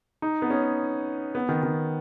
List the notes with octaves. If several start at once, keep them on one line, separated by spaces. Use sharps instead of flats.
D#4
B3
C#4
B3
D#3
D#3